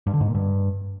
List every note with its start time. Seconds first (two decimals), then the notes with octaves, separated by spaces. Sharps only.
0.07 G2
0.14 D3
0.21 G#2
0.28 A#2
0.35 G2